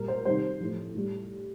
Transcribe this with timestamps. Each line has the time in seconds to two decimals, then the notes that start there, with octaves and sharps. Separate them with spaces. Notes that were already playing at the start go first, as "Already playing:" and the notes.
Already playing: A#2 G3 A#4
0.08 C5
0.25 C3 D#3 G3 C5
0.60 A2 F3
0.95 A2 G3